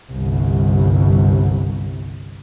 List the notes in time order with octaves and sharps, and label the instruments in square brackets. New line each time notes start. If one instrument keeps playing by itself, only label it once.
[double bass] G1 C2